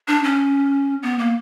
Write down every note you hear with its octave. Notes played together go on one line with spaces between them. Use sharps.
D4
C#4
B3
A#3